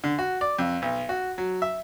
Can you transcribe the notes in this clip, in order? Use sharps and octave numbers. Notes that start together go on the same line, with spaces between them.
D3
F#4
D5
F2
B1
F#4
F#3
E5